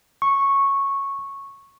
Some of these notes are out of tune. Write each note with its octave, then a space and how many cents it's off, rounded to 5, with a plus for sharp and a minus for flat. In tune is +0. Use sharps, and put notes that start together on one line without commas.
C#6 -10